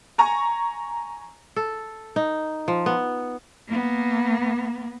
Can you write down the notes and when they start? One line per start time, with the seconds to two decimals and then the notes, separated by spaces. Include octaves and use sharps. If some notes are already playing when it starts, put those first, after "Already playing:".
0.18 G#5 A#5 C#6
1.56 A4
2.16 D#4
2.68 F3
2.86 B3
3.68 A#3 B3